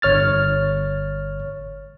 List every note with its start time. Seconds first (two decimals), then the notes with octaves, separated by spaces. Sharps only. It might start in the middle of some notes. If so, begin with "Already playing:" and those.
0.02 G1 C#5 F6 A6